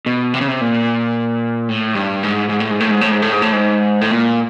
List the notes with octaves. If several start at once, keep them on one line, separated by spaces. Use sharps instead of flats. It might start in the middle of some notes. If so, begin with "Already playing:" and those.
B2
C3
C#3
C3
A#2
A2
G2
G#2
G#2
A2
G#2
A2
G#2
A2
G#2
A2
G#2
A2
G#2
A2
A#2